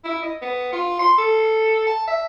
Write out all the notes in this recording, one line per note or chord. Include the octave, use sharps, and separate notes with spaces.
E4
D#5
B3
F4
C6
A4
A5
E5